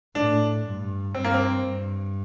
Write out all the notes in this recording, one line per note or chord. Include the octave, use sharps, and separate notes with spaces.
A2 D4
G2
G2 C4
A#3
C4
G2